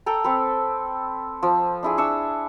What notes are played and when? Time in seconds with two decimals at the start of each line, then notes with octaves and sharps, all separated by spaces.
0.06 A4 G5 A#5
0.24 C4 A4 B4
1.43 F3
1.83 D4 E4 G#4
1.98 D4 C#6 E6